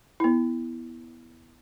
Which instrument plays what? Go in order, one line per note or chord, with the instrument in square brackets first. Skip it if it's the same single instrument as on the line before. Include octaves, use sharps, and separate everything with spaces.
[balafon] B3 E4